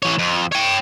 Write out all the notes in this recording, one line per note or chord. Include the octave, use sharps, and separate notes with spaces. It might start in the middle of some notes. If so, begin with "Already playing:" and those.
E3 C#5
F2
C#5 G5